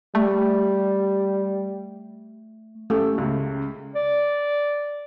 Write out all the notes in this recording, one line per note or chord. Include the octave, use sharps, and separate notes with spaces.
G3 A3
A3 C#4 G4 A4
C#2 C#3
D5